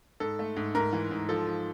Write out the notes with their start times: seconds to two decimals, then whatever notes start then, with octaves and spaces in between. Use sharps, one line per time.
0.20 G#2 A4
0.39 A3
0.56 G#2
0.75 G#2 A#4
0.93 E3
1.11 G#2
1.29 F3 A4
1.47 F3